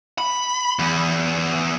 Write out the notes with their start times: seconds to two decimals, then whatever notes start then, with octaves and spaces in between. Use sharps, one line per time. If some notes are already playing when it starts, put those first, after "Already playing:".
0.18 B5
0.79 E2